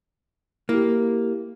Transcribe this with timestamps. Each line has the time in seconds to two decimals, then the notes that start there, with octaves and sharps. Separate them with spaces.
0.69 A#3 E4 G4